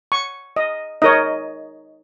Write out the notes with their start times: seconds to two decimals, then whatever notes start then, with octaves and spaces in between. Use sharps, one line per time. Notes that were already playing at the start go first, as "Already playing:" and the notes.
0.12 C#6
0.56 D#5
1.02 D#4 A#4 C#5 D#5